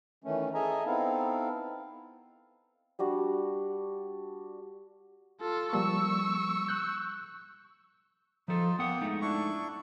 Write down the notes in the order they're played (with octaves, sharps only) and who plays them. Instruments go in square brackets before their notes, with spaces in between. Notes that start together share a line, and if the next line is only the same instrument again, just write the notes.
[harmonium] D#3 E3 A3 C#4
G#4 A4 D#5 E5 G#5 A#5
B3 C4 D#4 E4 A4 F5
[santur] G3 D4 F#4
[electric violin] F4 A4
[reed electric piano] F3 G3 A#3 [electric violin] C#6 E6
[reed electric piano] F#6 G6
[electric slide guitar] F3 A4 [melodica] D#4 F4
[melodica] A#3 G5 D#6 [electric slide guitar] B3 F#5
[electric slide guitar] G#3 A3 D#4
[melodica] D4 E4 C#6